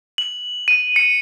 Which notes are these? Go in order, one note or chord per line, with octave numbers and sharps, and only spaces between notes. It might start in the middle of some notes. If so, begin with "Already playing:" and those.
F#7
D#7
C#7